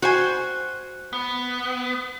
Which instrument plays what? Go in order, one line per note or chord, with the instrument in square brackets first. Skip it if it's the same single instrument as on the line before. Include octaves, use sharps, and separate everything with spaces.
[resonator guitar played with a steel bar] F#4 C5 G#5
[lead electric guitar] B3